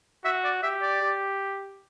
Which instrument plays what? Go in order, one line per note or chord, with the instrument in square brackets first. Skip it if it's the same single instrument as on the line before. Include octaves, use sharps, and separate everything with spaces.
[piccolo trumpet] F#4 [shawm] E5
[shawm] D5
[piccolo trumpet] G4 [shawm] E5
[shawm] D5
[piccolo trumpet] G4